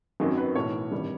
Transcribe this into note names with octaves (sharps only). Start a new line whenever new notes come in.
G#1 F#2 D#3 F#3
B4
B1 A2 E3 C#5
G#1 G2 E3 G3